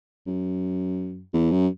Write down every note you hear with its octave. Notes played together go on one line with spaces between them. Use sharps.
F#2
E2
F#2